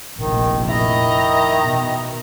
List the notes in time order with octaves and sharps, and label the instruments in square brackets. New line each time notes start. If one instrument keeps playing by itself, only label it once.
[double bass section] F1 A#1 [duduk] D#3
[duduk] D#3 [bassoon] E4 [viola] D#5 A#5
[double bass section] B2